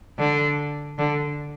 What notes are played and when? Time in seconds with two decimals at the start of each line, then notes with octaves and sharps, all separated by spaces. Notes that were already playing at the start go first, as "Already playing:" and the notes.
0.19 D3
0.98 D3